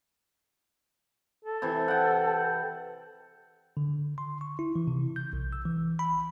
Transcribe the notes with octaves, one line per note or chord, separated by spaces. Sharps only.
A4
C3 E3
F#5 G5
D3
C6
C#6
E4
E3
C3
G6
B1
E6
E3
B5